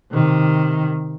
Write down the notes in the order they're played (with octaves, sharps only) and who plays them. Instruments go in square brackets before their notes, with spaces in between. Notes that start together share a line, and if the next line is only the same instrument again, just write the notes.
[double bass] C3 D#3